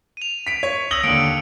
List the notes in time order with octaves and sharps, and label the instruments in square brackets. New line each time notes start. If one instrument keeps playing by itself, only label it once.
[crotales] D#7 F7
[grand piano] B6 D7
C#5
[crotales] D#6 E6 [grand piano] A#6 F#7 G7
[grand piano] D#2 D3 [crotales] C#7 D7